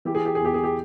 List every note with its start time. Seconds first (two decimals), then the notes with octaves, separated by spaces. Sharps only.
0.05 E3 G4
0.15 G#4
0.26 G4
0.35 G#4
0.40 E2 G4
0.54 G#4
0.64 G4